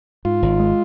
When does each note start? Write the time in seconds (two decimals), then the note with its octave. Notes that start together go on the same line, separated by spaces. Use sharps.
0.25 G#2 F4
0.42 G#1
0.59 G#3